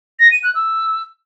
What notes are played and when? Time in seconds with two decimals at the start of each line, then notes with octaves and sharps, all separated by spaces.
0.19 A#6
0.31 D#7
0.43 F#6
0.55 E6